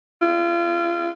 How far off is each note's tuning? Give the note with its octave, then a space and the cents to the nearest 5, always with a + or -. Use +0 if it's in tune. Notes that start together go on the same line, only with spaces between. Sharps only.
F4 -35